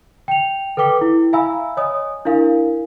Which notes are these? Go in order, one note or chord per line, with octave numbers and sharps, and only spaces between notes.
G5 F7
A4 B4 G5 D6 B6 G7
E4
E5 F5 G#5 A#5 B5 E6
C#5 D#5 G#5 D#6
D4 E4 A#4 F5 G#5